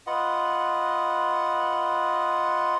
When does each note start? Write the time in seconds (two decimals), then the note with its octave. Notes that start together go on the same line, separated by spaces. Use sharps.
0.07 F4 B4 D#5 F#5